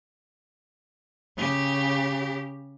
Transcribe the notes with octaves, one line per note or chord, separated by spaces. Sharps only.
C#3 G4